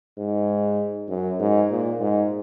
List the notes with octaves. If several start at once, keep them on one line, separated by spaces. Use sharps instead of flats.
G#2
F#2
G#2
A#2
G#2